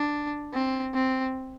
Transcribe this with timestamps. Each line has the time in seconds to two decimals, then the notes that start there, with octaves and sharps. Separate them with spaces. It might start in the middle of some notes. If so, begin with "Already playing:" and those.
Already playing: D4
0.53 C4
0.94 C4